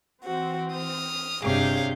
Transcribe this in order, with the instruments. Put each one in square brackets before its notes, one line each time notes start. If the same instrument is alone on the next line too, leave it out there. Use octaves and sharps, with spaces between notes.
[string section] E3 C4 [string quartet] F#4
[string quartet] D#6 F6
[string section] G1 C#5 G6 [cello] C3 D4 [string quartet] G#4 F5